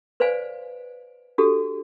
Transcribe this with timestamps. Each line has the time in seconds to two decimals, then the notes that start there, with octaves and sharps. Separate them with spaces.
0.20 B4 C5 D5 F5 G#5
1.38 D4 F#4 G4 A4